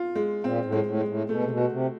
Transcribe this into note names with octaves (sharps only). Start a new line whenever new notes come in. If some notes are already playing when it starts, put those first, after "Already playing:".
Already playing: F4
G#3
A#2 C4
A2
G#3
A2
G#3
A2
B2 A3
C3
B2
F#4
C3